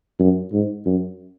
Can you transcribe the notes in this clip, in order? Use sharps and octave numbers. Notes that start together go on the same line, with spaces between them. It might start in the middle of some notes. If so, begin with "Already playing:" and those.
F#2
G#2
F#2